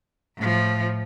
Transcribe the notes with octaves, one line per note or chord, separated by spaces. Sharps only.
A2 F3